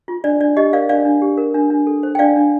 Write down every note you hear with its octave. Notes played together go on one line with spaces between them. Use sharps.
F4
D4 D5
D4 D5
G4 D#5
A#4 D5 F5
D4 D5 F5
D4
G4
A#4
D4
D4
A4
C5
G5
D4 D5 F5
D4